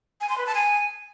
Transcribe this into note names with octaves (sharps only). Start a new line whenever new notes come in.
G#5
C6
B4
A5
G#5